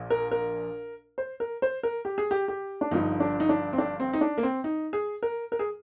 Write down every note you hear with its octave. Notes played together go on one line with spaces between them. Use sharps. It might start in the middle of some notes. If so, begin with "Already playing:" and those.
Already playing: A#1 A#2
A#4
A#4
C5
A#4
C5
A#4
G4
G#4
G4
G4
D4
G1 G2 F3 D#4
D4
D#4
D4
C4
D4
C4
D#4
D4
A#3
C4
D#4
G#4
A#4
A#4
G#4